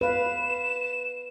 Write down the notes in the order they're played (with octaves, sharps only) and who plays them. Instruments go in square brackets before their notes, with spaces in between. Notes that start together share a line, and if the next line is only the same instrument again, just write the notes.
[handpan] B4 F5 [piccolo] E7